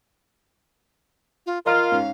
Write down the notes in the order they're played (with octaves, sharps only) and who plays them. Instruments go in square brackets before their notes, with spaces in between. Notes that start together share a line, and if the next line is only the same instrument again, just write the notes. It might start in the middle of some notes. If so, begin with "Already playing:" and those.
[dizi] F4
[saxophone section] F4 [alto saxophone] A#4 [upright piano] D#5 A#5 F6 [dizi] F5
[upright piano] G#2 C#4